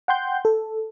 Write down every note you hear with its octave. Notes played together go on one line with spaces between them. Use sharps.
F#5 G5 C6 G6
A4